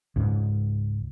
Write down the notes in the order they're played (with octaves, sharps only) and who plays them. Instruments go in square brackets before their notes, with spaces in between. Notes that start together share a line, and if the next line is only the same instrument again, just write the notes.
[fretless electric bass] C#2 G#2